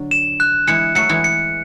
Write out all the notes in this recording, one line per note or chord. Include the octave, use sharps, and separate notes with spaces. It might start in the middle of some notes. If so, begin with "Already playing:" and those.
Already playing: D3 F#3
E7
F#6
E3 G#3 C#7
F#3 A3 C#7
E3 G#3
C#7